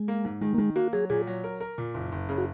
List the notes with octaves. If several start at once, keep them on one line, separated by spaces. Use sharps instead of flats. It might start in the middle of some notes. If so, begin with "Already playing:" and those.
Already playing: G#3
A#3
G#2
D#3 G#3
A#3
D#3 G#3
A#3 F#4
F#3 G#4
A#2 G#4
F#3
A#4
A#4
A#2
F#1
F#1
C#3
F#4